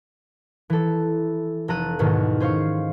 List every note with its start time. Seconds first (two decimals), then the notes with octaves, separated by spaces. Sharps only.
0.70 E3 A4
1.68 F1 A4 A#5 F#6 D#7
1.99 E2 G#2 B2 D#3 G#3
2.40 C#4 C5 F5 C#6